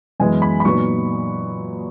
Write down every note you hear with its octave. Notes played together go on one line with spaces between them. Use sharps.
F#2 E3 G#3 B3 G#5
B5
B5
A#2 F#3 B3 D#4 C#6